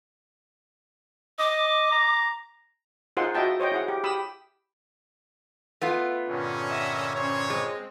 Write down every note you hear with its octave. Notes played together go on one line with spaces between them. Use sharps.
D#5 D6
A#5
D#4 F4 G#4 C5 F#5 C6
F#4 D#5 E5 G5 A5
C5 C#5 D#5 G5
E4 G#4 F#5
G4
G4 B5 D#6 E6
A3 B3 F4
G2 A#2 D3 C#4
D#5 E5 F#5
C#4 C5 C#5
G#3 C4